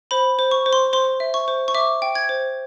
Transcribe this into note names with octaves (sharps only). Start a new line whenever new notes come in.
C5 B5
C5
C#6
C5
C6
C5 C6
E5
C#6
C5
C#6
E5 D6
G5
G#6
C5